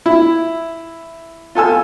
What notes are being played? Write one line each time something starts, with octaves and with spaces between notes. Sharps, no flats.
E4
F4 A4 G#5 E6